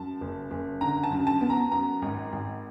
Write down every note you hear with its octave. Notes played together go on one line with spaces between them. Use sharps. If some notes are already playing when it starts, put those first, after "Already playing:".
Already playing: F#2 A5
F#1
F#1
D3 A#5
A5
F#2
A5
B3
A#5
F#2 A#5
G#1
G#1